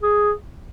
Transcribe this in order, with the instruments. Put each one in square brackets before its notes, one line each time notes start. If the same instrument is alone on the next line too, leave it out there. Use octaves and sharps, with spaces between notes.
[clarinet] G#4